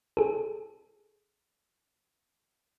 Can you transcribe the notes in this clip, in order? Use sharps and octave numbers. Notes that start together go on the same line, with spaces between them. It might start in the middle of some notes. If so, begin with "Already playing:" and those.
G#4 A4